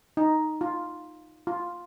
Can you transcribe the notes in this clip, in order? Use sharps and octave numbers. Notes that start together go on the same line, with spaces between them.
D#4
F4
F4